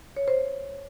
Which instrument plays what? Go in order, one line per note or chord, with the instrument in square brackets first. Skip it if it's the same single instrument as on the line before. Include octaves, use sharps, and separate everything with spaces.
[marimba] C#5
C5